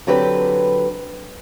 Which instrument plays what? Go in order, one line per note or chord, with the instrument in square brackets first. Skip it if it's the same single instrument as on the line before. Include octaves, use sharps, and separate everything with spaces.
[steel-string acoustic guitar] D3 F#3 C4 G4 B4